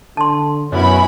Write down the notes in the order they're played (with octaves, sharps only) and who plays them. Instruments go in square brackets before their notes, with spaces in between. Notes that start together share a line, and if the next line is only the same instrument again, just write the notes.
[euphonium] D3 [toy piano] A5 C6
[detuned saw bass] F#2 [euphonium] B2 [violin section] C#4 E4 B5